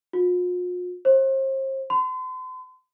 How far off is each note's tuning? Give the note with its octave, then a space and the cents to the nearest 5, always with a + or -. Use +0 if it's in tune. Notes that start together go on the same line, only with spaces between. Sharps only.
F4 +45
C5 +35
C6 -40